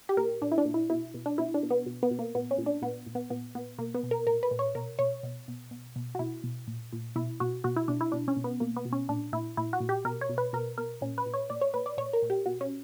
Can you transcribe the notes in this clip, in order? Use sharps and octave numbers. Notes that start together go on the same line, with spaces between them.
G4
A#2 A#4
A#2 D4
E4
D4
A#2
E4
B2 E4
B2
D4
B2 E4
D4
B2
B3
B2
B3
B2
A#3
A#2 B3
C#4
A#2
D4
A#2 B3
A#2
B3
A#2 B3
A#2 B3
B2 A#3
B3
B2
A#4
A#2 A#4
B4
A#2
C#5
B2 A#4
B2 C#5
B2
B2
B2
B2
F#4
B2 E4
B2
A#2
A#2
B2 E4
B2 F#4
B2 F#4
E4
B2 D4
E4
B2 D4
C#4
B2
B3
B2 A#3
B3
B2
C#4
A#2 D4
A#2 E4
A#2 E4
F#4
A#2
G4
B2 A#4
C#5
B2
B4
B2 A#4
B2 A#4
A#2 C#4
B4
A#2
C#5
A#2 D5
C#5
A#2 B4
D5
A#2 C#5
A#4
A#2
G4
B2 F#4
C#4